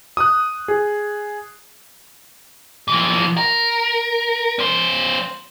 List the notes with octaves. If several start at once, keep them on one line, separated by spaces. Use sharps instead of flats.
D#6 F#6
G#4
E3 F3
A#4
C#4 C5